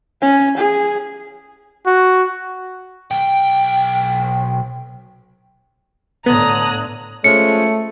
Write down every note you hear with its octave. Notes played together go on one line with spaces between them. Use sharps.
C#4
G#4
F#4
B1 G5
A2 D3 B3 A#5 D#6 F#6 G#6
F3 G#3 A3 C#4 C#7